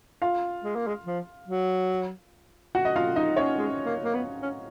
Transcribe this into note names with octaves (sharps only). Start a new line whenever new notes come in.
F4 F5
G#3
A#3
G#3
F3
F#3
F#4 F#5
D#5
F4 F5
D#4 D#5
C#4 C#5
G#3
A#3
A#3
B3
C#4